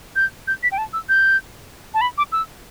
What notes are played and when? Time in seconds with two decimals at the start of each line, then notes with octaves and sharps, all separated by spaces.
0.16 G6
0.47 G6
0.63 B6
0.72 G5
0.78 A5
0.93 E6
1.09 G6
1.94 A5
2.01 B5
2.18 D6
2.32 E6